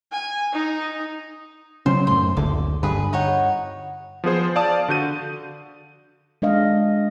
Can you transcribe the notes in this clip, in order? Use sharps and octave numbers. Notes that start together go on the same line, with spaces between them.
G#5
D#4
C#3 F#3 C#4 C5
F#2 A2 C6
F#1 D2 D3 D6
G2 D3 G#4 B4
D#4 C#5 F#5
F3 B3 G#4 C5
D5 F5 A5 D#6
D3 F#4 G6 D#7
G#3 D4 D#5 F5